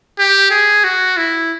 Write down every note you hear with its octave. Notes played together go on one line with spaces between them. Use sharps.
G4
G#4
F#4
E4